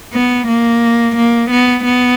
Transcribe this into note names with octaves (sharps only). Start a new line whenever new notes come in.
B3
A#3
A#3
B3
B3